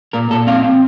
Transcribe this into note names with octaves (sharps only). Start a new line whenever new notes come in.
A#2 A#4
A#2 A4
C4 F5
C4